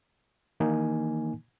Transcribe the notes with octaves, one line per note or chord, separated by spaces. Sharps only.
D#3 E3 A#3 D#4 G#5